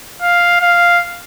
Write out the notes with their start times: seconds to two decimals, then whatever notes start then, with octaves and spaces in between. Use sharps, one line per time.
0.22 F5
0.61 F5